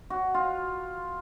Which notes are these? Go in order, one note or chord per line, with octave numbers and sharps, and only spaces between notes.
F#4
F4